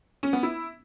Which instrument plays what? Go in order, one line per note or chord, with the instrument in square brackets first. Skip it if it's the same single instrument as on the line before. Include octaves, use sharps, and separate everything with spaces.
[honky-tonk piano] C#4
B3
E4